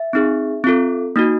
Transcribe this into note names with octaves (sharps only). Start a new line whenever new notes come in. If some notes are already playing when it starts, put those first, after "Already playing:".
Already playing: E5
C4 D#4 G#4
C4 F4 A4
A#3 D#4 F#4